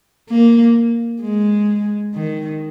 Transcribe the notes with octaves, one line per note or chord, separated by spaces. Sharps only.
A#3
G#3
D#3